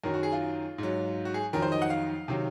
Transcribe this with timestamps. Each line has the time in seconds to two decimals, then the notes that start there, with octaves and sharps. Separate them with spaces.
0.04 F#2 D#3 F#3 A#4
0.14 F#4
0.23 G#4
0.32 F4
0.78 G#2 F#3
1.25 F#4
1.34 G#4
1.53 F2 D#3 F#3 A#4
1.62 C5
1.72 D#5
1.82 F#5
1.90 F5
2.28 C3 D#3 F#3